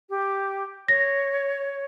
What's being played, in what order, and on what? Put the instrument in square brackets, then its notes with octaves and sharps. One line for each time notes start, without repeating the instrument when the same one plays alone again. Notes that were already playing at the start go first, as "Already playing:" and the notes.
[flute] G4
[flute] C#5 [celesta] A#6